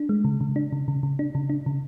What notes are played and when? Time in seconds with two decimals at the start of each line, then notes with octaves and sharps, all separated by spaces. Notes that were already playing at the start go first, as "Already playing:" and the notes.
Already playing: D4
0.09 G#3
0.24 C#3
0.41 C#3
0.56 D4
0.72 C#3
0.88 C#3
1.03 C#3
1.19 D4
1.35 C#3
1.49 D4
1.66 C#3